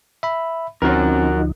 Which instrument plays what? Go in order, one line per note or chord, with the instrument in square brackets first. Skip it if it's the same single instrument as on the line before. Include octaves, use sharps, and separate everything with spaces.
[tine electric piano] E5 B5
[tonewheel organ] D2 F3 D#4 [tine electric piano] C4 C#4 [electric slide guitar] F#4 A#4